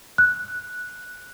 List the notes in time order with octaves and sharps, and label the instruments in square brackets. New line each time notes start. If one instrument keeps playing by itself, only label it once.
[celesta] F#6